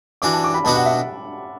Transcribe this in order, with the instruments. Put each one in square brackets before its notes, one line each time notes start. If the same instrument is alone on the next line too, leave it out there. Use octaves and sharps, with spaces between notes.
[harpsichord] E3 D4 F#4 [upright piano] D6
[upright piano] A5
D6
B5
[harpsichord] B2 B3 D4 F#4 [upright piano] A5
[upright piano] F#5
E5